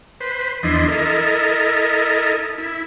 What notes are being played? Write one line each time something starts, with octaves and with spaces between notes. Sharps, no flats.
B4 C5
E2 F3 D4 E4 D#5 C6
E4 A4 A#4 D#5
E4